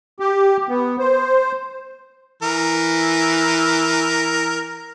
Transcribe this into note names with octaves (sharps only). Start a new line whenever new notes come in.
G4
B3
C5
E3 A#4